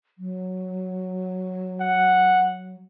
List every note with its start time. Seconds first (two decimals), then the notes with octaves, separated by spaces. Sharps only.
0.18 F#3
1.80 F#5